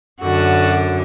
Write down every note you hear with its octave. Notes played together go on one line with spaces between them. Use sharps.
F#2 D3 F#4